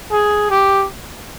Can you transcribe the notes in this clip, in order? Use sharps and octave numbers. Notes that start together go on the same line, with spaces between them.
G#4
G4